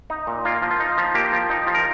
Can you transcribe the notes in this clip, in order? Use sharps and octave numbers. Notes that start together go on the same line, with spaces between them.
D#4
A#2
A#3 F4
F3
F4
D#4
F3
A#3 G4
F3
D#4
F3
A#4